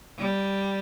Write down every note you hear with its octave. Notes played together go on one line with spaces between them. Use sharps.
G3